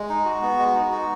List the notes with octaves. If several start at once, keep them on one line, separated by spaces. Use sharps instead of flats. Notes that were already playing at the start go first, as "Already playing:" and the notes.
Already playing: G#3
D#4
F#4
B3
G#3
D#4
F#4